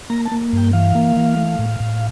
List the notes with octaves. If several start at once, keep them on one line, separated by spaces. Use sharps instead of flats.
A#3 A#5
A5
A#3
G2 G5
E3 F5
A#3
E3
A3
A2
A2